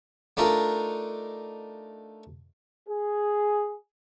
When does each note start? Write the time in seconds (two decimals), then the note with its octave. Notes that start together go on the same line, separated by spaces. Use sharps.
0.37 A3 D4 D#4 F4 A4 A#4
2.89 G#4